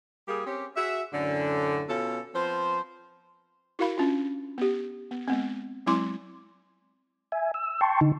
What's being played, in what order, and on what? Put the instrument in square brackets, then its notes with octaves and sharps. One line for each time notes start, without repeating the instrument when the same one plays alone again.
[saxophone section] G3 A#3 G4 G#4
C4 C#4 G4
F#4 G#4 E5
F#2 A2 D3
B2 C#4 F4 A4
F3 B3 C4 C5
[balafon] E4 F#4 A#4 F5 B5
C#4 D4 F4
B3 G4
B3
G#3 B3 C4
F#3 G#3 C4 E4 C6 D6
[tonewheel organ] E5 G#5
E6
G5 A5 C6 C#6
D3 D#4